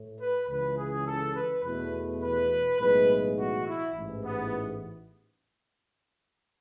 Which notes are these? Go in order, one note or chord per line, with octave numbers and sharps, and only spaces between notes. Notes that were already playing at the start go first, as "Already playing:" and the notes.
Already playing: A2
B4
C#2 C#3 E3 B4
G#4
A4
B4
E2 B2 A3 B4
B4
B1 A2 E3 G#3 B4
F#4
E4
A1 G#2 E3
B3